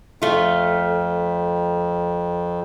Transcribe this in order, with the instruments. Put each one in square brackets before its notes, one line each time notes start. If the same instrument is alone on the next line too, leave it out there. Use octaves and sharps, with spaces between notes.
[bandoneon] F2 [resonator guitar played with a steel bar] A3 F4